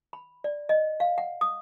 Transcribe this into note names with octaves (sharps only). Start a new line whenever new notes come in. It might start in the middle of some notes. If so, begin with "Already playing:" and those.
B5
D5
D#5
F5
F#5
D#6